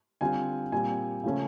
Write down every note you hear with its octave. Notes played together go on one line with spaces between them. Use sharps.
D3 G3 C4 F4 G#5
A#2 G3 C4 G#5
C#3 F3 A3 C#4